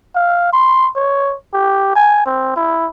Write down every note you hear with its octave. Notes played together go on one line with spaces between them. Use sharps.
F5
C6
C#5
G4
G#5
C4
E4